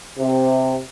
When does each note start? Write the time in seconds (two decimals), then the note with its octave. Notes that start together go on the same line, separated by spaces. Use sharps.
0.19 C3